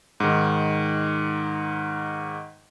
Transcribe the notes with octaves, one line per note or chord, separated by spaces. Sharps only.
G#2 D#3